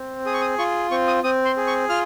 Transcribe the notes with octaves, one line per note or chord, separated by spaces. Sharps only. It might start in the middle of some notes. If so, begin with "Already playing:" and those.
Already playing: C4
G#4 D#6
C#6
D#6
F4 C#6
C4 C#6
D#6
C4 D#6
C6
G#4
C#6
F4 F6